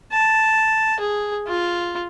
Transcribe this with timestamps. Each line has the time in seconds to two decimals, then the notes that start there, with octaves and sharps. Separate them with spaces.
0.13 A5
1.00 G#4
1.47 F4